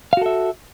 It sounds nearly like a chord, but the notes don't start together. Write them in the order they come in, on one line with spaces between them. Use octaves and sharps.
F5 F#4 A4 E5